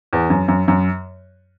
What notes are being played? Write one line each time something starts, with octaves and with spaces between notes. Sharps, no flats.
E2
F#2
F#2
F#2